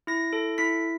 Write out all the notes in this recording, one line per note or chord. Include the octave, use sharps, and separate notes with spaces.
E4 A#6
A4
E4 B6